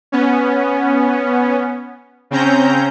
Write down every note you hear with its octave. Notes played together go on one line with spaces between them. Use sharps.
B3 C#4
C#3 C4 C#4 A#5 G6